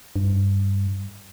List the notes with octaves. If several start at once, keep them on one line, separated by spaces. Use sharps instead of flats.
G2